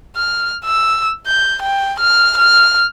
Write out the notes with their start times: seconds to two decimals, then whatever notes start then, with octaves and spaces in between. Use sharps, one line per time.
0.16 F6
0.65 E6
1.27 G6
1.62 G5
2.00 F6
2.38 F6